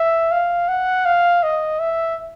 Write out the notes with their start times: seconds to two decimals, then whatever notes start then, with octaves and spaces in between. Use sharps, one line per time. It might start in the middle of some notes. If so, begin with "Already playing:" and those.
Already playing: E5
0.32 F5
0.68 F#5
1.05 F5
1.43 D#5
1.80 E5